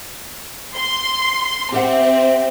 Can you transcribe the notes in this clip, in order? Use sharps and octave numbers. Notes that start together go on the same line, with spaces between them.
C6
C4 G4 E5 F#5